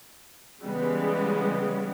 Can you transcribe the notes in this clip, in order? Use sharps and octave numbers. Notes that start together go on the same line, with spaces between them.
C#3 E3 G3 G#3 B3